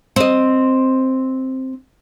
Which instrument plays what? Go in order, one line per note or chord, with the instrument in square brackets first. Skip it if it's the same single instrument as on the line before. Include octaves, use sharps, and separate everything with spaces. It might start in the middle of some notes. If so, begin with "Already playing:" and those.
[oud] C4 D#5